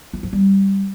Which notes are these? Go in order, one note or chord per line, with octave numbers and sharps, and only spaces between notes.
F4
F3
G3